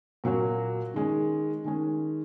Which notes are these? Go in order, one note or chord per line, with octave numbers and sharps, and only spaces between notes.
A#2 F#3 A#3 C#4 F#4
D#3 G#3 C#4
D#3 G#3 C#4